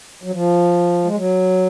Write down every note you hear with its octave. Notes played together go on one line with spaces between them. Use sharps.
F#3
F3
G#3
F#3